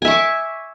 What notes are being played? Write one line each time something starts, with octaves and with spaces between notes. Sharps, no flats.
E5 G#5 C#6 D6